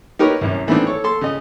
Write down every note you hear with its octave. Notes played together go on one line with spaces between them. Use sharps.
D#4 G4 A#4 B4 C#5
C2 F#2 C#4
D#3 E3 A3 B3 C4 D4
A4 C#5
A4 C6
C#3 D#5